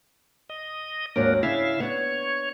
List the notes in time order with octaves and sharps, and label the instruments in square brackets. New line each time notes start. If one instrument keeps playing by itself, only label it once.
[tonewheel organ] D#5
[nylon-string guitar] D#2 G#2 F#3 [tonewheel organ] A#3 D4 A#4
[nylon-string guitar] C#3 D4 [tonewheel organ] E4 E5 F5
[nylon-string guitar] B3 D4 [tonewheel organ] C#5